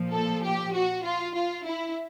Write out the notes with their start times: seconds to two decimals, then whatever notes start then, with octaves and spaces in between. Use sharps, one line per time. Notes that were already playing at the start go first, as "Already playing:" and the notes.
Already playing: A#2 F3
0.14 A4
0.44 G4
0.75 F#4
1.04 F4
1.35 F4
1.65 E4